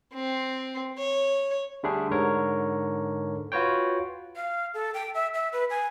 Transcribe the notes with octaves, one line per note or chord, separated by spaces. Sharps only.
C4
C#5
D3 G3 A3 D4 G#4
G#2 D3 A#4 C#5
F4 F#4 B4 C#5 G5
F5
A4
G5
E5
E5
B4
G#5